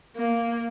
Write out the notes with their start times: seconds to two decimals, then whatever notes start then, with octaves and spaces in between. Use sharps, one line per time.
0.16 A#3